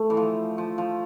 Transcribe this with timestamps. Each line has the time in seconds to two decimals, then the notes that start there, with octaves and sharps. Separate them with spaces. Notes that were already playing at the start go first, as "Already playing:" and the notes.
Already playing: A3
0.10 E3
0.17 F3
0.58 F3
0.78 F3